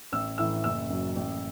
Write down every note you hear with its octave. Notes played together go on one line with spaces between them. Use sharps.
A1 E6
A2 E3 A3 E6
F#1 E6
F#2 F#3
A1